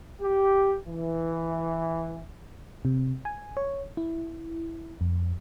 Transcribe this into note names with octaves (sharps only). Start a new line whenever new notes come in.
G4
E3
C3
G#5
C#5
E4
F2